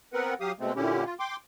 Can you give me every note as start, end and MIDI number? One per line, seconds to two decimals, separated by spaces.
0.13 0.34 59
0.13 0.34 60
0.13 0.34 70
0.13 0.34 71
0.13 0.34 78
0.41 0.52 54
0.41 0.52 67
0.41 0.52 77
0.41 0.52 87
0.60 0.73 47
0.60 0.73 56
0.60 0.73 57
0.60 0.73 60
0.76 1.04 46
0.76 1.04 50
0.76 1.04 61
0.76 1.04 64
0.76 1.04 67
1.05 1.14 65
1.19 1.36 79
1.19 1.36 84
1.19 1.36 86